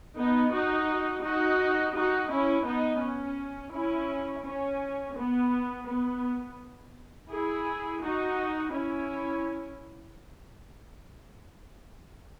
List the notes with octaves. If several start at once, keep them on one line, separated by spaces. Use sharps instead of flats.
B3 D#4
D#4 F#4
D#4 F#4
D#4 F#4
C#4 E4
B3 D#4
C#4
C#4 E4
C#4
B3
B3
E4 G#4
D#4 F#4
C#4 E4